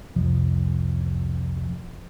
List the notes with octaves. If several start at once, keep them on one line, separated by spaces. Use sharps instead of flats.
C2 F2 C3 F3